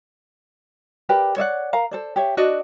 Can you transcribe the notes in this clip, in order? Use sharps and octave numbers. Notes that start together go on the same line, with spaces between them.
G4 A#4 B4 D5
C#5 D5 E5 F#5
A#4 F5 A#5
A4 C5 D5
G4 C#5 E5
D4 F#4 D5 D#5